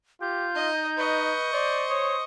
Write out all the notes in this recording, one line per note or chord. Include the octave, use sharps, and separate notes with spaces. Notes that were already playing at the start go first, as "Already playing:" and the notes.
F4 G4 G6
D#4 D#5
B4 D#5 C#6
C5 D5
C#5 D#6